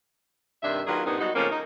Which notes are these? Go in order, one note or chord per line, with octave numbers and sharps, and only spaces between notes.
G2 C3 D#3 D4 E5
D#3 F#3 A#3 F4 G#4 B4
G2 A#2 G3 B3 C4 D#4
F#3 G3 B3 D#4 F#4
C#3 F3 A3 A#3 C4 C#4
D#4